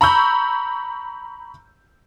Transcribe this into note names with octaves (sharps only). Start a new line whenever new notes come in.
A#5 B5 C#6 E6 G6